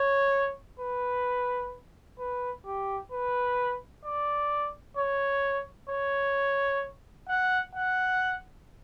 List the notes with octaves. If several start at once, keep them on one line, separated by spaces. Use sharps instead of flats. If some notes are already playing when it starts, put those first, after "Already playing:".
Already playing: C#5
B4
B4
G4
B4
D5
C#5
C#5
F#5
F#5